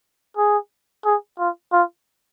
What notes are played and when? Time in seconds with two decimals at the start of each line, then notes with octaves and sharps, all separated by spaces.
0.37 G#4
1.05 G#4
1.39 F4
1.73 F4